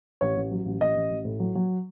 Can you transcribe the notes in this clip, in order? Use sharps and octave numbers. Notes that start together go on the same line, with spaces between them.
A1 C#5
A1
F#3
A1
A1 D#5
A1
A1
A2
F#3
F#3